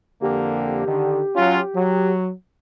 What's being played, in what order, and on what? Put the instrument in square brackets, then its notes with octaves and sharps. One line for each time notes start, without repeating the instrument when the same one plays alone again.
[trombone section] F2 D3 A#3 [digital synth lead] G4
[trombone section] D3 D#3
F#3 C#4 F4
F#3